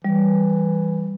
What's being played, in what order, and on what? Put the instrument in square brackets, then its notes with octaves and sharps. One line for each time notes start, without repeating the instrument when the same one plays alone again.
[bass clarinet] E3 [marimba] G3